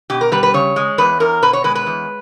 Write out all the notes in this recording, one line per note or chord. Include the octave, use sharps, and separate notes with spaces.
B2 G4
A#4
G3 B4
B4
C#3 C#5
G#3
E2 B4
E2 A#4
B2 B4
C#5
G#3 B4
B4
E2